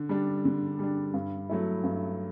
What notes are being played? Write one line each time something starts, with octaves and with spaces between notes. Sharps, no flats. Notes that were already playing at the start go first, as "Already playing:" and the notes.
Already playing: D3
G3 D4
D3
G3 D4
G2
F#3 A3 E4
G2